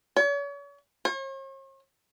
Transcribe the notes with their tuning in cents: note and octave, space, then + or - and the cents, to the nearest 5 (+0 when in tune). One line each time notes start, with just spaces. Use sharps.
C#5 +40
C#5 -45